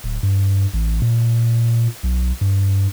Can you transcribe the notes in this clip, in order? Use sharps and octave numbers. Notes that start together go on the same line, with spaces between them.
D1
G2
A1
A#2
B1
G2